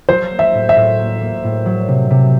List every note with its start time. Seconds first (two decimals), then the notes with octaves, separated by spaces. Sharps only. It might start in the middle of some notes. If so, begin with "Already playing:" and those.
0.09 F#3 C5
0.31 A#3
0.39 E5
0.54 A2
0.69 E5
0.76 A2
0.99 A#3
1.21 A#3
1.44 A2
1.66 F#3
1.88 C3
2.10 C3